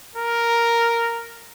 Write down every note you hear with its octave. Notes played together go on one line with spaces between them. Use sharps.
A#4